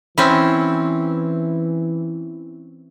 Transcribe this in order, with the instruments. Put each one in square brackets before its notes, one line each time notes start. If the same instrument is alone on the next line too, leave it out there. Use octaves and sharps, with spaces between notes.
[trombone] E3 [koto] C4 C#4 E4